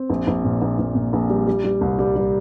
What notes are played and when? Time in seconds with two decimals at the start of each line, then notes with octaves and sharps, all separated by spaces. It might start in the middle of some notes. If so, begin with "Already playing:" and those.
Already playing: C4
0.10 A#1
0.27 A#1
0.44 A#2
0.62 A#1
0.79 A#1
0.95 A#2
1.13 A#1
1.29 G3
1.47 G3
1.64 G3
1.81 C2
1.99 G3
2.16 G3